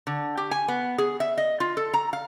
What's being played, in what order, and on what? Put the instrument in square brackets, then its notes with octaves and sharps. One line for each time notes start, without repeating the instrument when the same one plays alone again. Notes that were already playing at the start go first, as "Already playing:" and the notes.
[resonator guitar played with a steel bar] D3
G4
G#5
B3
G#4
E5
D#5
F4
A4
A#5
F5